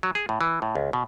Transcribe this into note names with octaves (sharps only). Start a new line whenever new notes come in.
F#3
G#4
A2
E3
A2
C#2
B2